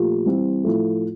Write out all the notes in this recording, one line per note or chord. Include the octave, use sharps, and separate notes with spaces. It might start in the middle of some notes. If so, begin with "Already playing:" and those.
Already playing: A#2 F3 A3 G4
E3 G3 C4
A2 F3 A3